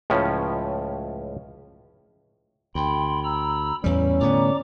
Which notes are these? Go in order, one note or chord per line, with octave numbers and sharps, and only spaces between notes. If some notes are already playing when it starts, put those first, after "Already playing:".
C#2 A2 F3 C#4
D2 G5 B5 C6
A#5 B5 E6
E2 A2 E3 G3 C#4
A2 D3 B3 D5 A#5 D6